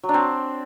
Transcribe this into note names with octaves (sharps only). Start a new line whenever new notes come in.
F#3
D4
C4